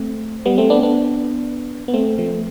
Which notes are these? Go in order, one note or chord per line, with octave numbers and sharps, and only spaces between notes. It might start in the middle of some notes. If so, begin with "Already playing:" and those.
Already playing: A3 C4
G3 B3
A3 C4
B3 D4
B3 D4
B3
A3 C4
F3 A3